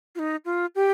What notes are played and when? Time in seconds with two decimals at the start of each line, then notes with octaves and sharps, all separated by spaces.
0.15 F4
0.19 D#4
0.45 F4
0.75 G4